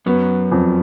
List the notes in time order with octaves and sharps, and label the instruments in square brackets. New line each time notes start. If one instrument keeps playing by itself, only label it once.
[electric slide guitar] F#2 F#3 [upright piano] B3
[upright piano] F2